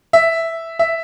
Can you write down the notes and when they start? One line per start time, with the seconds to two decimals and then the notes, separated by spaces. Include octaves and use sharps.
0.13 E5
0.79 E5